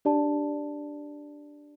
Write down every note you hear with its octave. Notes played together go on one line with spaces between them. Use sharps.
D4 G4 D5 A5